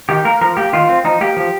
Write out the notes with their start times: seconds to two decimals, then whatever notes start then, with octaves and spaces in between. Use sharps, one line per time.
0.09 D#3 G4
0.25 A#3 A#4
0.41 F3 A#4
0.57 A#3 G4
0.73 D#3 F4
0.89 C4
1.04 F3 D#4
1.21 A#3 G4
1.37 F3